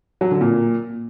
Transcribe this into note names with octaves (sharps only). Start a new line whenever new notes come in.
F#3
D3
A#2